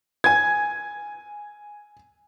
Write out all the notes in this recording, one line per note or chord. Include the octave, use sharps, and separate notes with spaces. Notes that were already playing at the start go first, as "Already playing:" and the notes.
G#5 G#6